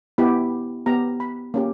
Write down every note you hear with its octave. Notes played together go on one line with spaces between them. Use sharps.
B3 E4 G4 B5
B3 G4 A#5
B5
A#3 C#4 G4